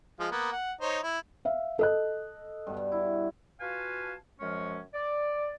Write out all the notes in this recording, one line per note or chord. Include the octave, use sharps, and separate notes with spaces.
F3 G#3 F4
A#3 B3
F#5
D#4 C5 C#5
E4
E5 F5
A4 D#5 F#6
G2 B2
E4
F4 F#4 B4 F5 G#5 A5
F#2 F3 G#3 C#4 C#5 F6
D5